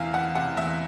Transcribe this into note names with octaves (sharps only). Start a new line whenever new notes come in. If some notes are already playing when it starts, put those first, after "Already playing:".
Already playing: E2 C3 E3 E5 F5
E2 F#5
C3 F#5
E2 E5